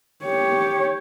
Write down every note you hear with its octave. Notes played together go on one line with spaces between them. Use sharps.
G4 C#5